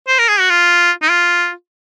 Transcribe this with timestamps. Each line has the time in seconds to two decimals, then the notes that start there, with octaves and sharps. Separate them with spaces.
0.08 C5
0.19 A#4
0.28 G#4
0.40 F#4
0.50 F4
1.02 D#4
1.10 F4